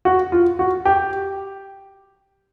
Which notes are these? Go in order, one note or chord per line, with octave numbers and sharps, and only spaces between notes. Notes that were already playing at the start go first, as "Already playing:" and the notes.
F#4
F4
F#4
G4